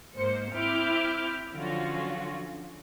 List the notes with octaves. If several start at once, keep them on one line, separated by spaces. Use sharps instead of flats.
G#2 A#3 C5 C#7
C4 E4 D6 F6 G6
D3 F3 F#3 C#4 F4 F#4